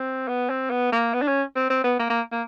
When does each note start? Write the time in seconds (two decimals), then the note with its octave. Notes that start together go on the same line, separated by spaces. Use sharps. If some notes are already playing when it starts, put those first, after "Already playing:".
Already playing: C4
0.28 B3
0.49 C4
0.70 B3
0.92 A#3
1.14 B3
1.22 D4
1.28 C#4
1.56 C4
1.70 C4
1.84 B3
1.99 A#3
2.10 A#3
2.32 A#3